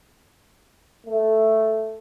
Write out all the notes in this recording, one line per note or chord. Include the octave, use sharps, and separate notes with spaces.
A3